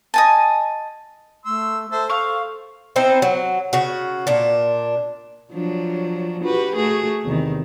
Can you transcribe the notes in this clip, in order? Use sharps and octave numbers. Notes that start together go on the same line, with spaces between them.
D#5 G#5 A5
A3 C6 E6
A4 C5 E5 A5
C5 F5 C#6
C4 D#4 E4 C5
F#3
C#3 F#4
A#2 D4
F3 F#3 D4
F#4 G4 B4
A3 F#4 G#4
E2 C3 D#3